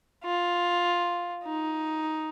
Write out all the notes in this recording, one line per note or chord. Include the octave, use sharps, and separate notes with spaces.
F4
D#4